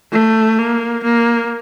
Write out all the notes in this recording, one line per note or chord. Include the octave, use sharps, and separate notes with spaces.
A3
A#3
A#3